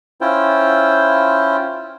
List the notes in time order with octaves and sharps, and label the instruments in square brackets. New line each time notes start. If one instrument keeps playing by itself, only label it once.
[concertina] C#4 E4 F4 C5 G5